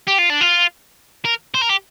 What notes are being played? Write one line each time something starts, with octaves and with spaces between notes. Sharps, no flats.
G4
F4
D4
F4
A#4
C5
A#4
G4